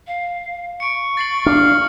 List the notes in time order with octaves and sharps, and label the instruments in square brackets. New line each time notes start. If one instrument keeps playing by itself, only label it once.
[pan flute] F5
[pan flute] C#6 [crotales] C#7 D7
[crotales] A6 C7 F#7
[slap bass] D4 [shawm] F5